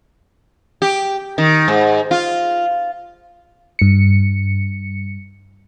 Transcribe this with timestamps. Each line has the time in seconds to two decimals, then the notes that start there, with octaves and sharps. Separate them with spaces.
0.82 G4
1.38 D#3
1.68 G#2
2.11 F4
3.79 G2 C#7